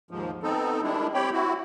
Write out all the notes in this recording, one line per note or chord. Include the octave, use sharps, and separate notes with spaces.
D#2 G#2 F3
B3 C4 D#4 A4
D#3 G3 G#3 D4 E4
C4 G4 C#5 G5 B5
E4 F#4